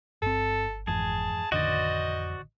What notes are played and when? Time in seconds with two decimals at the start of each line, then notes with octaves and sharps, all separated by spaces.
0.22 G1 G2 C4 A4
0.87 F2 G#2 E3 G#4 A5
1.52 A1 F2 D3 D#3 F#4 C5 D5 D#5